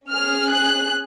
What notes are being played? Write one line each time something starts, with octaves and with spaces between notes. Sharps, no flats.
C#4 G#4 F6
F#6